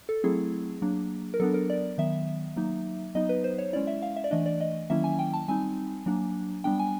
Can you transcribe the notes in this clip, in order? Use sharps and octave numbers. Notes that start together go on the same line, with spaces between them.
A4
F#3 A3 C4 E4 G#4
F#3 A#3 D4
A#4
F#3 B3 D4 A4
A#4
D5
D#3 F#3 B3 E5
F#3 A#3 D#4
F#3 B3 D#4 D#5
B4
C5
C#5
G#3 C#4 E4 D5
E5
F5
E5
D5
E3 A3 D4 D#5
D5
D#5
D#3 F#3 A#3 C#4 E4 E5
G#5
G5
A5
G3 C4 D#4 G#5
F#3 A#3 D4
G3 B3 D4 G5
G#5